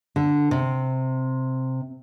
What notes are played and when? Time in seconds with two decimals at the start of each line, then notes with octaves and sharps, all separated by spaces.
0.16 D3
0.51 C3